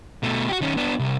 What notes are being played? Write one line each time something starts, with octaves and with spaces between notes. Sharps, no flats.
B2 A3
F#4 G4
D#3 C#4
B3 D4
C2